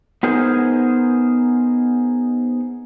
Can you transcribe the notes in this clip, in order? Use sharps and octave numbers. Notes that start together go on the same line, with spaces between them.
B3 D#4 G#4 A#4 C5